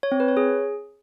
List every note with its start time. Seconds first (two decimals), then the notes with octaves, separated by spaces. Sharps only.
0.03 C#5
0.12 C4
0.20 B4
0.28 C#5
0.37 G#4